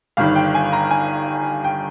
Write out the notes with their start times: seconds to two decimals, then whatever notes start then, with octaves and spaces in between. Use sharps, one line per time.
0.17 G1 G2 D#3 F5
0.36 G5
0.54 G#5
0.73 A#5
0.91 G#5
1.64 G5